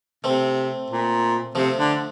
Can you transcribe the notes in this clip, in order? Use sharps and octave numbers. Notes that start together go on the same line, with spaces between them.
C3 A3 C4
A#2
C3 F3 A3
D3